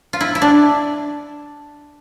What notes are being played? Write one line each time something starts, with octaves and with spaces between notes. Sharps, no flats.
F4
E4
E4
D4